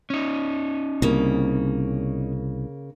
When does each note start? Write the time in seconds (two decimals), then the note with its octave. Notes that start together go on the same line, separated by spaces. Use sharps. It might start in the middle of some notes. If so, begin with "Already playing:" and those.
0.10 C#4 D#4
1.02 C2 C#3 A#3